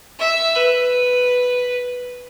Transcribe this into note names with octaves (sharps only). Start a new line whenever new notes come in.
E5
B4